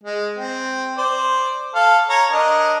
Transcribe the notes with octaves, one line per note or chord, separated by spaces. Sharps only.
G#3
C4
C5 D5
A4 F5 A5
C#5 A#5
D4 A#4 D#5